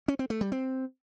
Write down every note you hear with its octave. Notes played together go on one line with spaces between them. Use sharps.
C#4
C4
A3
G3
C4